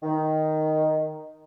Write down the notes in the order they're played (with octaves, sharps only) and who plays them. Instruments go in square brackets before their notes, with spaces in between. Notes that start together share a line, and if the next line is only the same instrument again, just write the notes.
[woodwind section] D#3